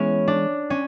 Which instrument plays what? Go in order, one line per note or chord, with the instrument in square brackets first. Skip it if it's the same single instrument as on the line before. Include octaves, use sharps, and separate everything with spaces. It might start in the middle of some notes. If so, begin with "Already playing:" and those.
Already playing: [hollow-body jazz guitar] E3 G#3 B3 E4 [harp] C#4
[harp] D4
C#4